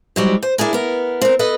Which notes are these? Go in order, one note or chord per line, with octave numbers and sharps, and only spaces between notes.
G#2 F#3 G3
C5
D4 E4 G#4 A#4
B3 A#4
C4 A#4
A4 B4 D#5